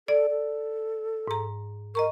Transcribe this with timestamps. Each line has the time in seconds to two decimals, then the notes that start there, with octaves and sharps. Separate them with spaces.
0.08 A4 D5
0.29 A4
1.28 G#2 A#5
1.95 A#4 D#5 A#5 C#6